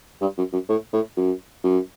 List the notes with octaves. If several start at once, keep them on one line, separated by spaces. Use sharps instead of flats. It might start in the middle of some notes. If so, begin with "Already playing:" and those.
G2
F#2
F#2
A2
A2
F#2
F#2